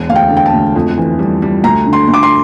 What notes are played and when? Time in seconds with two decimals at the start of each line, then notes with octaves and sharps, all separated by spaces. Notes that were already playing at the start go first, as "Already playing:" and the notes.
Already playing: E1
0.09 D2 F5
0.15 G5
0.30 D3
0.37 G5
0.46 A5
0.53 D2
0.76 F2
0.98 E3
1.19 G3
1.42 G3
1.64 D2 A#5
1.86 D3
1.93 C6
2.08 D2
2.14 D6
2.23 C6